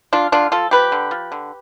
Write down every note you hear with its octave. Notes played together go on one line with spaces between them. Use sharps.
F3 D4 F4
D3 D4 F4
F3 F4 A4
F3 G4 B4
D3
F3
D3